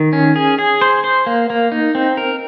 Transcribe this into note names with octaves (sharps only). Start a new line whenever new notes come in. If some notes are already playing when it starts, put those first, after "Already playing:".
Already playing: D#3
C#4
G#4
G#4
C5
C5
A#3
A#3
D#4
C4
A#4